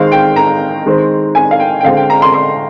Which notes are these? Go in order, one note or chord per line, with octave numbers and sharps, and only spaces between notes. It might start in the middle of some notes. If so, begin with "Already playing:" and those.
Already playing: D#3 G#3 C4 F5
G5
A#5
D#3 G#3 C4
G#5
F5
G5
G5
D3 G#3 C4 F5
G5
A#5
C6
C6